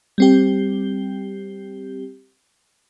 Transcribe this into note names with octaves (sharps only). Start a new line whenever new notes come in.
G3 C4 G4